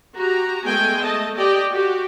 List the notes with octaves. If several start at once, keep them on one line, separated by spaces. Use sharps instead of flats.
F#4 G4 A#5
G#3 A3 B3 G#4 G5 G#5
A3 D#5 A5
G4 D5 D#5 G5
F#4 G4